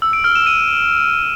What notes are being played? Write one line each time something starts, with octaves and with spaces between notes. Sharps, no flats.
E6
D7
F6
E7
D#7